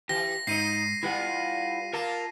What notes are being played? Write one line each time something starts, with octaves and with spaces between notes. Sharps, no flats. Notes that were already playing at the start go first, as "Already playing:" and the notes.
E3 G4 A#6
G#2 D#4 D#5 C7 D#7
G3 E4 F4 B4 F#5
A#3 F4 A#4 A5